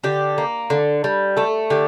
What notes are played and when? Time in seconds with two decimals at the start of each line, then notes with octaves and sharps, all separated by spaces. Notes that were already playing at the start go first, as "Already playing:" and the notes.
0.04 D3 G4
0.38 A#3
0.70 D3
1.04 G3
1.37 A3 A4
1.70 D3 G4